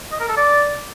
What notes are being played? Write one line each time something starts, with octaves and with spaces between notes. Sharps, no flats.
D#5
A#4
A4
D5